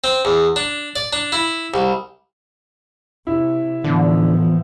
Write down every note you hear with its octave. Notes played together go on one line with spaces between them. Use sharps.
C4
E2
D4
D5
D4
E4
C2
C3 E4
A2 D3 E3 F3 B3